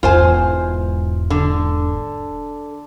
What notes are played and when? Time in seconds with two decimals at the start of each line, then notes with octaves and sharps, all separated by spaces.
0.03 E1 G#2 F4 C5 G#5
1.30 D3